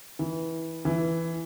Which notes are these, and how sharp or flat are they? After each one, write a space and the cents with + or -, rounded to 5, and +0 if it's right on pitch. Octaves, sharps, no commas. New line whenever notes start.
E3 -15
E3 +5